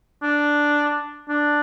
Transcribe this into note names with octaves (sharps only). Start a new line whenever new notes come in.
D4
D4